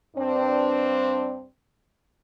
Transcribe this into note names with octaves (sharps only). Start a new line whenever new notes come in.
G2 C4 D4